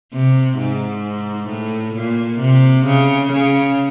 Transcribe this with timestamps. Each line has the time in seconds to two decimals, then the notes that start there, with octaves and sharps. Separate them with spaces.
0.13 C3
0.58 G#2
1.49 A2
1.95 A#2
2.40 C3
2.86 C#3
3.32 C#3